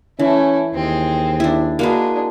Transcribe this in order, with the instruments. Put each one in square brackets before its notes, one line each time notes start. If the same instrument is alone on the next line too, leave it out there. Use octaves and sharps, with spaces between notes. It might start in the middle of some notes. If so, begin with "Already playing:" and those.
[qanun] E3 [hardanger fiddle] A3 E4 [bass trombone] C#4
[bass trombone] D#2 [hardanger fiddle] G#3 C4
[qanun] D4 E4
[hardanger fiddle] G#3 D4 [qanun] A#3 F#4 B4